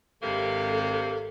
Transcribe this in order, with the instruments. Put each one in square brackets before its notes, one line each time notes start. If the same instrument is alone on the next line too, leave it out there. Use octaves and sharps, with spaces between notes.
[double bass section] G#1 [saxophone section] G2 C3 A#3 [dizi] A4